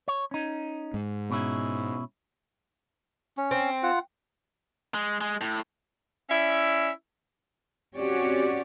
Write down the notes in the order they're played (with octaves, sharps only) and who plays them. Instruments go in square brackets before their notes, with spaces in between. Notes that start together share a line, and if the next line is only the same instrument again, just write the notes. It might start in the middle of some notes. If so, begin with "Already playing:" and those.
[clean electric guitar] C#5
C#4 D#4
[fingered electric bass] G#2
[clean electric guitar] B2 C#4 E4
[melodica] C#4
[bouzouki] C4
[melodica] F4 F#5
[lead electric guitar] G#3
G#3
A2
[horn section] C#4 E4 D5 E5
[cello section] C4 C#4 F#4 G4 C#5 D5